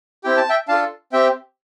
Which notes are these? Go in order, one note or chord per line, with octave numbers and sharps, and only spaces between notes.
C4 E4 G4 G5
A5
E5 G5
D4 F4 A4 F5 A5
C4 G4 E5 G5